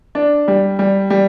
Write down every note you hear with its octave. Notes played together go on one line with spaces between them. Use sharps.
D4
G3
G3
G3